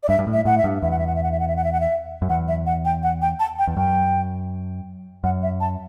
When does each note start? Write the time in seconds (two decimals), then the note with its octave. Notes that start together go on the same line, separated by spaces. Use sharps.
0.03 D5
0.09 G2 E5
0.19 G2
0.27 A2
0.33 E5
0.45 A2 F#5
0.58 E5
0.64 G2
0.82 E2 E5
0.91 F#5
0.99 E5
1.07 F#5
1.15 E5
1.23 F#5
1.32 E5
1.40 F#5
1.48 E5
1.56 F#5
1.64 E5
1.72 F#5
1.80 E5
2.22 F#2
2.29 E2 F#5
2.48 E5
2.66 F#5
2.85 G5
3.03 F#5
3.22 G5
3.40 A5
3.59 G5
3.67 E2
3.77 F#2 G5
5.24 F#2 F#5
5.42 E5
5.60 A5